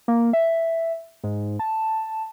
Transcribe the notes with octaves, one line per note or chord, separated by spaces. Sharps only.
A#3
E5
G#2
A5